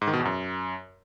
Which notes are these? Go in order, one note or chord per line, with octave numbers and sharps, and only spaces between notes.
G#2
D#3
B2
E2
F#2